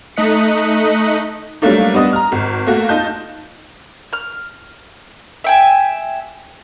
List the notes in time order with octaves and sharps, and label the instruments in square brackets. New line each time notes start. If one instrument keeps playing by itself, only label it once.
[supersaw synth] A3 D#4 D#5 F#6 B6 C#7
[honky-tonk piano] F#3 G3 A3 A#3 D4 D#4
G3 B3 D4 D#5 D#6
A#5 F6
G#1
A3 A#3 F#4
D#4 F4 D#5 A5 G6
[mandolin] F6
E5 G5 G#5